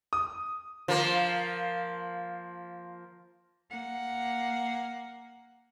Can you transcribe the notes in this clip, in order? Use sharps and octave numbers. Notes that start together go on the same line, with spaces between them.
D#6
F3 A#3
A#3 F#5